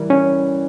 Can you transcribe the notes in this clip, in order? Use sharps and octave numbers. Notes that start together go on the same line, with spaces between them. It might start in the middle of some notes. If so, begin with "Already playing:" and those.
Already playing: E3 G3 A#4
C#4